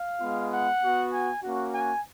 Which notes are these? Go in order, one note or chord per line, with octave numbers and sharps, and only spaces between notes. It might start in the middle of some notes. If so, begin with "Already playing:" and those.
Already playing: F5
G#3 B3 F4
F#5
B3 F#4
G#5
A#3 C#4 F#4
G#5